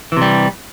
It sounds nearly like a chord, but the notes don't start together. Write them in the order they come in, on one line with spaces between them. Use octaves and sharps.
E3 C3 G3